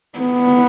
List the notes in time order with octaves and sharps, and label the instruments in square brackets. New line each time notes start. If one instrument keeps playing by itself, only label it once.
[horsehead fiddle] B3